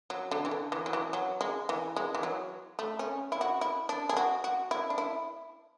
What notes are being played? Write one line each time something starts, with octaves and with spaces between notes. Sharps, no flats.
F#3
D3
E3
D3
E3
F#3
E3
F#3
G#3
E3
G#3
E3
F#3
A3
C#4
E4
F#4
E4
D4
G#4
F#4
F#4
E4
D4
E4